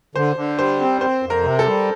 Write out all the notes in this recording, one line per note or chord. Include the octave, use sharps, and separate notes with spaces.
D3 C5
D3
G3 C5
C4
C4 C5
F2
A#4
C3
A4
G3